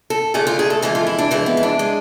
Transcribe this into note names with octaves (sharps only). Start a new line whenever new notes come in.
A4
F2 D3 A3 G#4
F4
G#4
A4
F2 E3 G#3 A4
F4
E4
D4
F2 E3 G#3 E4
B3
E4
D4
G#3